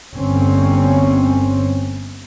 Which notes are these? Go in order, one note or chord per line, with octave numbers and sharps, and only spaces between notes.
G1 C4 C#4